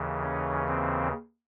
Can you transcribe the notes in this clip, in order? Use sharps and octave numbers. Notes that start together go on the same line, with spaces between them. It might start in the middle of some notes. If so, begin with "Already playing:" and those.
Already playing: D#2 C#3 E3
C#4
C4